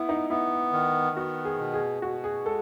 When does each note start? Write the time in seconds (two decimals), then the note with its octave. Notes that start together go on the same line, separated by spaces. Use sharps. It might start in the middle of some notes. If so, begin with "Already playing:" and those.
Already playing: B3 E4
0.09 D#4
0.30 B3 E4
0.73 D#3
1.16 B3 F#4
1.45 G#4
1.59 B2
1.74 G#4
2.02 B2 F#4
2.24 G#4
2.45 G#3 A4